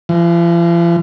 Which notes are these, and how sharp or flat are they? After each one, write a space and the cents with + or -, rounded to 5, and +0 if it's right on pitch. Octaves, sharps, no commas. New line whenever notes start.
F3 -45